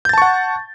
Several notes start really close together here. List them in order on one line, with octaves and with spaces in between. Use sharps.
G6 A6 A5 C#6 F#5